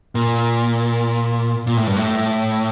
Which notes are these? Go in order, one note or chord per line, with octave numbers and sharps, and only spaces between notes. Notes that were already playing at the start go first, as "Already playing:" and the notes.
A#2
A#2
A2
G2
A2